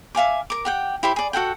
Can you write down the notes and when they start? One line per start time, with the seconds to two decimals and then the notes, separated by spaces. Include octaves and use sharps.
0.15 E5 F5 G#5 D6
0.50 A#4 D6
0.65 G4 F#5 G5
1.03 E4 G4 C5 B5
1.16 G#4 D5
1.33 F#4 A4 F#5 G5